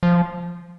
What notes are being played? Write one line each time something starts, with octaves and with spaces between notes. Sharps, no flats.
F3